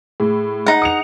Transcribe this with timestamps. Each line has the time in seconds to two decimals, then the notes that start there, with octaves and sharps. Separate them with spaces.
0.20 A2 G#4
0.66 D#4 F#5
0.82 D#6 C#7 F7